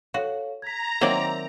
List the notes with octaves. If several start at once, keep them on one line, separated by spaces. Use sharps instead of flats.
F#4 A4 C#5 F5
A#5 G#6 B6
D#3 F#3 A#3 C4 D5 E5